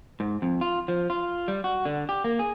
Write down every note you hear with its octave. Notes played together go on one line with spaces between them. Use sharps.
G#2
F2
F4
F3
F4
G3
F#4
D3
G4
A#3
G#4